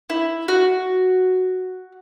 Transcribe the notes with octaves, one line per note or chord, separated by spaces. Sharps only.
E4
F#4